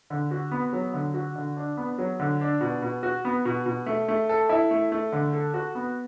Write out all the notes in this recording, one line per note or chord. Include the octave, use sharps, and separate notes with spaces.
D3
F#4
B3
F#3
D3
F#4
D3
D4
B3
F#3
D3
D4
B2
B2
F#4
B3
B2
B2
A3
A3
A4
E4
A3
A3
D3
A4
F#4
B3